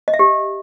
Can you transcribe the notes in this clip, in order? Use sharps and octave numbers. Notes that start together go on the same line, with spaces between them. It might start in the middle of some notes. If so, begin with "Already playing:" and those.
D#5
E5
G4